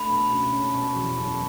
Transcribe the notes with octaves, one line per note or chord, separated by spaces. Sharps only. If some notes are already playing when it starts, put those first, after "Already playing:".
Already playing: A3 D4 B5
B2
C#2
C#4
B2
E2
F#1